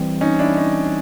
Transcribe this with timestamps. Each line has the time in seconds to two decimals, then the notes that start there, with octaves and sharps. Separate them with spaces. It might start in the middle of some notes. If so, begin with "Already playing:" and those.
Already playing: E3 G3 C4
0.21 C#4 D#4
0.39 D4 E4
0.57 C#4 D#4